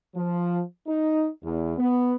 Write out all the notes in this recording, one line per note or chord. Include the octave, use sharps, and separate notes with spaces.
F3
D#4
E2
B3